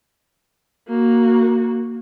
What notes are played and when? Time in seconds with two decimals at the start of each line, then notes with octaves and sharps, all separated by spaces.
0.88 A#3 F#4